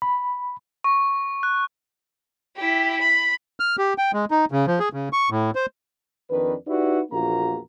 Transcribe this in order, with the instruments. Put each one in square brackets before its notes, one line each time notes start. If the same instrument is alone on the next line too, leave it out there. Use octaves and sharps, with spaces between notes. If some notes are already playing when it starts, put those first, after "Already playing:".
[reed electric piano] B5
[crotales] C#6
F#6
[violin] E4 G4
B5
[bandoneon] F6
G4
G5
G#3
D#4
C#3
F3
G#4
C#3
C#6
A2
C5
[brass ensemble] F2 D#3 D4 B4
D#4 E4 F#4 G4 B4 D5
A#1 E2 A#3 F4 F#4 A#5